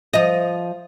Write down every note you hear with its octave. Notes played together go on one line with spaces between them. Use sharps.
F3 D#5